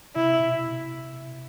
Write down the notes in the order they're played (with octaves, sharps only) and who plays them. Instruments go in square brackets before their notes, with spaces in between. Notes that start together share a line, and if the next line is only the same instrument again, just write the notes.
[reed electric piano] C3 [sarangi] E4
[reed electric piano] B2